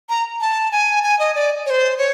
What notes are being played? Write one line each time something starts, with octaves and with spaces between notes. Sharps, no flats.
A#5
A5
G#5
G#5
D#5
D5
C#5
C5
C#5